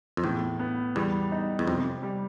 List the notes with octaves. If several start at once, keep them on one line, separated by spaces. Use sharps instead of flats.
F2
E2 A2
B3
E2 G3
D#4
E2
F2 C3
G3